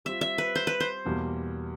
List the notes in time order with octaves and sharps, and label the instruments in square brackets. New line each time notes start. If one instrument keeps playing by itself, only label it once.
[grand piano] G3 C4 F4 [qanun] E5
[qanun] E5
B4
C5
B4
C5
[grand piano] E2 B2 G3 A#3